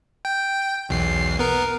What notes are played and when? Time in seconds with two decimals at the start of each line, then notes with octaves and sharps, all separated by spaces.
0.25 G5
0.89 B1 E2 C7
1.39 B3 A#4